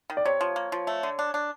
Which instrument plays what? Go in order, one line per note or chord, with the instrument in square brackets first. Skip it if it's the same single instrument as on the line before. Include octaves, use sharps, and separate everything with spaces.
[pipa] D#3
[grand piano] D5
[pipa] C3 [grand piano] C#5
[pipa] F3
A#3
F3
A3
D3
D4
D4